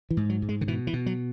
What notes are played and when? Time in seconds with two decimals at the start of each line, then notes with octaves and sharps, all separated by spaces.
0.11 E3
0.17 G#2
0.30 F#3
0.42 G#2
0.49 G#3
0.61 D3
0.68 B2 E3
0.87 E3
0.93 B2
1.06 F#3